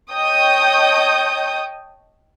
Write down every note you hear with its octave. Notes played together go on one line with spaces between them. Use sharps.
C#5 D#5 G5 A5 D#6 G6